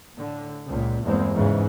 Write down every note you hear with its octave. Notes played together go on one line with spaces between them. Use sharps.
A2 D3
C#2 A#2
E2 G2 E3 G#3 A#3 C4
E2 G#2 C#3 E3